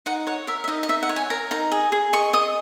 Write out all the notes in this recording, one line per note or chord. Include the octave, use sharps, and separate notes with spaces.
D#4 F#5
C#5 F#5
A#4 E5
E5
D#4 D#5
D#5
D#4 E5
F#5
C#5
G#5
A#4 A#5
D#4 A#5
G#4
G#4
D#5 C#6
D#5 D#6